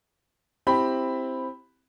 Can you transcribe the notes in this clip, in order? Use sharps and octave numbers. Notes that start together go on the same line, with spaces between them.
C4 E4 G4 B5